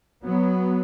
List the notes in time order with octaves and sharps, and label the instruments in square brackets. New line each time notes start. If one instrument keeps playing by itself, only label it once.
[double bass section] F#3 B3